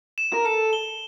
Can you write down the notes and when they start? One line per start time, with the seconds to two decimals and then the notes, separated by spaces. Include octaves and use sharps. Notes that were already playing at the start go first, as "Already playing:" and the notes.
0.18 E7
0.33 A#4
0.45 A4 E7
0.73 G7